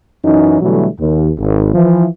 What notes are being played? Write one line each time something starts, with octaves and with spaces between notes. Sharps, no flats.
F#2 E3 C#4 D#4
B2 D3 E3 F#3 G3 A3
D#2
G#1
E3 F3